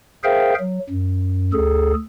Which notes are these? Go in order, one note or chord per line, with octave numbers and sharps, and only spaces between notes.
G#4 A#4 C5 E5 F5 G5
F#3
F#2
D2 G#4 A4